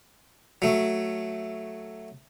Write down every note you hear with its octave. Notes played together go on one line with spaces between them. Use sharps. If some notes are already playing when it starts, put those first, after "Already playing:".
F#3 A3